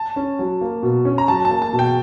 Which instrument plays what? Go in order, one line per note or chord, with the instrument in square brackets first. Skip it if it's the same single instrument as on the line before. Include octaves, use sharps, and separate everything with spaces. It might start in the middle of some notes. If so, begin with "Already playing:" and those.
Already playing: [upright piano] A5
[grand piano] C#4
F#3
A#3
B2
C#4
[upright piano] A#5
[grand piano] F#3 [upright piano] A5
[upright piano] A5
[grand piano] A#3
[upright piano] A5
[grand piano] B2
[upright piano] G5